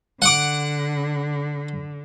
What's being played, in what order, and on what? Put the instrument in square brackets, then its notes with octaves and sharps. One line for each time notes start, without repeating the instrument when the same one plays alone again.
[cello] D3 [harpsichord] F#5 D6